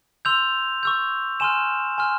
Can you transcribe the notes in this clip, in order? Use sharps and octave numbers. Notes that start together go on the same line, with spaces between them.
C6 E6 G6 F7
C#6 E6 G6
G#5 C6 F6 E7
G#5 C6 F6